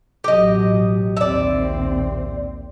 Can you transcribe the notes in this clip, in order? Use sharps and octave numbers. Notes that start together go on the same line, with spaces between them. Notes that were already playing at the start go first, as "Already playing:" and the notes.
A1 B2 F#3 G4 D#5
A#1 D#2 C4 D5 E5